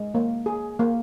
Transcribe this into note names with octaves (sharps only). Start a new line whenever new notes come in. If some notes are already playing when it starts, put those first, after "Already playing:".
Already playing: G#3
A#3
G#4
A#3